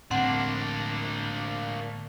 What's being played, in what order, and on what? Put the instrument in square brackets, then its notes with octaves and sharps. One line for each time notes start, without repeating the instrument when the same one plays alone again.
[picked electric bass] A2 D3 G#3 [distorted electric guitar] A#3 D4 [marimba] C4 F#5